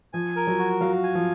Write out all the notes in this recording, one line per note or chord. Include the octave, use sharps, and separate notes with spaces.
F3 G#5
A#4
F#3
F#4
F#3 F5
G#5
F3